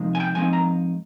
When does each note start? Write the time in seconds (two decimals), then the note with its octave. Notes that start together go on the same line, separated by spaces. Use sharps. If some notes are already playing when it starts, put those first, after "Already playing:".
Already playing: C3 F3 G#3 D#4
0.15 G#5
0.20 G5
0.35 G#2 F3 C4 D#4 G#5
0.53 A#5